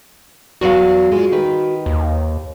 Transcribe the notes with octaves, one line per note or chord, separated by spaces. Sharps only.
E2 F#3 F#4 F5
G#3 F4
D#3 B4
D#2